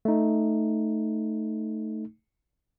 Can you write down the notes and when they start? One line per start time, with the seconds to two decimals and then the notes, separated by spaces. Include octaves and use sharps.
0.05 A3 D#4